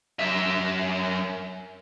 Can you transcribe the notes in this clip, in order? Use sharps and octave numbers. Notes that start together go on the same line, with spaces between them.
F#2 E5